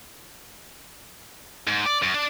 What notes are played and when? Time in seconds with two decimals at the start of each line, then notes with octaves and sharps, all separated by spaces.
1.68 G#2
1.86 D5
2.02 F#2
2.14 D4 D5